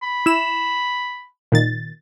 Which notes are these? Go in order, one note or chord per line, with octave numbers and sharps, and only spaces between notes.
B5
E4 E7
A#2 D#3 A6